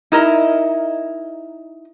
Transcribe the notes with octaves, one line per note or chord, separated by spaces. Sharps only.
D#4 E4 A#4 D#5